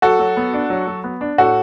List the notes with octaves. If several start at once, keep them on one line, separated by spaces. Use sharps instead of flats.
F#3 F#4 A4
F#3
B3
D4
F#3
F#3
B3
D4
A2 F#4 A4